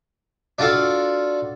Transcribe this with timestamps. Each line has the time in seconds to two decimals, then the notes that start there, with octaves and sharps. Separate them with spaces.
0.58 D4 F4 F#4 A4 F5